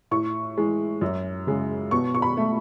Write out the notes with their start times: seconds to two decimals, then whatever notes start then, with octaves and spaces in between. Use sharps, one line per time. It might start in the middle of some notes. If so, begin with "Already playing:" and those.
0.11 A2 C#6
0.57 E3 G#3
1.01 F#2
1.47 C#3 G#3
1.91 B2 C#6
2.15 C#6
2.22 B5
2.37 A3